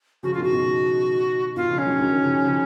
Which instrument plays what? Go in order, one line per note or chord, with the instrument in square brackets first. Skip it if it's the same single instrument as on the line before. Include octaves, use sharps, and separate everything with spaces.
[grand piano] C#3 F3 [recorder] F#4
[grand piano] B2 D#3 [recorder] F4
[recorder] F#4
[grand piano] B2 D#3
[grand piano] B2 D#3 [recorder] F4
[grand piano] C#3 F3
[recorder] C#4
[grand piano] D#3 F#3
D#3 F#3
D#3
C#3 F3
C#3 F3